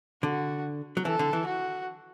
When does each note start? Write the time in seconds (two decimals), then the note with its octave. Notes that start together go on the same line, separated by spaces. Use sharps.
0.23 D3 F#4
0.97 F#3
1.05 E3 A4
1.19 D3
1.33 E3
1.46 F#4